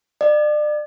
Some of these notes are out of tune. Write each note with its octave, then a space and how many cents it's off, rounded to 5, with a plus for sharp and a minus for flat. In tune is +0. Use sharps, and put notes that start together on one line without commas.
D5 +35